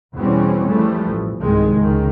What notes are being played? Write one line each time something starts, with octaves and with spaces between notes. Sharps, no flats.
E2 B2 E3 G3 C4 C#4
E3 F3 G3 A3
A1
C2 G#2 C3 D#3 G#3
C#2 D#3